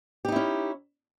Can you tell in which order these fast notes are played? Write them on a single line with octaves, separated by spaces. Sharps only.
G4 D#4 E4 C#4